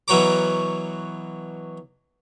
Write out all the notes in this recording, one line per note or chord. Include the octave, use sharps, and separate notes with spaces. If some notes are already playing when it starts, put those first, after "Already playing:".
B2 E3 F#3 C#5 A#5 D6